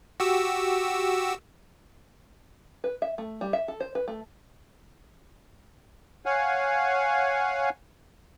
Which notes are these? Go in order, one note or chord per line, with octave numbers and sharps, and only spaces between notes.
F#4 G4 E6
B4
E5
A3
G3
E5
A4
C5
B4
A3
C#5 F5 F#5 G#5